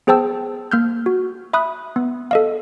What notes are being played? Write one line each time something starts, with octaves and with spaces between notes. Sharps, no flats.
B3 G#4 C5 G5 A5 E6
A#3 F6 G6
F#4
E5 B5 D#6 F#6
B3
A4 D#5 F5